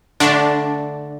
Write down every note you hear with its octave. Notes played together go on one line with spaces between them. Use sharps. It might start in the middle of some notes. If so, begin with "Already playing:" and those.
D3 A3 D4